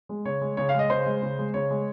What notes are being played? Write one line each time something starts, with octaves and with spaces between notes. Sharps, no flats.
G#3
C#3 C#5
G#3
C#3 C#5
F5
G#3
D#5
C#3 C5
G#3
C#3
G#3
C#3 C#5
G#3